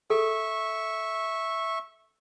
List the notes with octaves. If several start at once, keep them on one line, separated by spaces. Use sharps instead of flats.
A4 E5 C#6